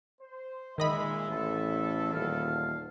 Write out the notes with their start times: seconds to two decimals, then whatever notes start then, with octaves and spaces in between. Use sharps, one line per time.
0.21 C5
0.78 A#2 D#3 G#3 D#5 E5 B5
1.29 A1 E2 A4
2.14 D#1 F5